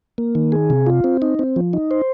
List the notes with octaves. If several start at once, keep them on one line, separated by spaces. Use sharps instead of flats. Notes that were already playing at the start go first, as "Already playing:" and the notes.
A#3
D#3
G#4
C3
F4
C4
D#4
C4
F3
D#4
C5